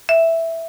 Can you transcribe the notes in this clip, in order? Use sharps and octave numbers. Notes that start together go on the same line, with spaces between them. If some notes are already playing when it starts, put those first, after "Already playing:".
E5